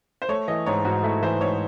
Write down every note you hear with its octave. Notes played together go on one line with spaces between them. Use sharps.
C5
A3 C#5
E3 D#5
G#2 C#5
G#2 F#4
A3 E4
E3 C5
G#2 C#5